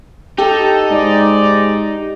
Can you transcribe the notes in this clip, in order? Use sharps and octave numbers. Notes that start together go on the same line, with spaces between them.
D#4 G4 A4
G#2 D5